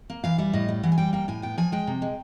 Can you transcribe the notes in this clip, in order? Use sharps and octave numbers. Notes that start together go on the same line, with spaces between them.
A#3
E3 F5
G3 E5
A2 D#5
G3
E3 F#5
G#5
G3 G5
A#3 G5
A2 G#5
B3 G5
F3 G#5
G#3 G5
C3
G#3